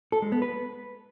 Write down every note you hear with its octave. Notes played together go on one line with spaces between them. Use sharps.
A4
G#3
B3
B4